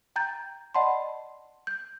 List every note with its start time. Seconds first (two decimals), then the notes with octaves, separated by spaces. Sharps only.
0.16 G5 A#5 G6 A6
0.75 D5 D#5 F#5 A5 B5 C6
1.67 G6